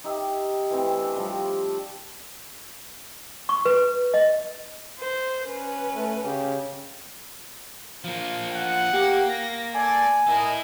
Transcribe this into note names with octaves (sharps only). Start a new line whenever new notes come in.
D#4 G4 D#5 E5
E3 A3 C4
D4
F3 G3
C#6
B4
D#5
C5
C#4 B4
A3
C#3 G4
F3 A#3
F#5
A#3 G4
A#6
A4 D5 G#5
E4 A4 A#4 D#5